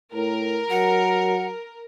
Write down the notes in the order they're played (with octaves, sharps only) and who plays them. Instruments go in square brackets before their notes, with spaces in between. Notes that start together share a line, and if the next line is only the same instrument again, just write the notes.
[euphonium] A2 [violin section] A#4
[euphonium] F#3 [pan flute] F#5